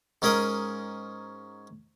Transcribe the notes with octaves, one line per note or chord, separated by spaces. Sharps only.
G#2 C#4 G#4 A#4 D#5 D#6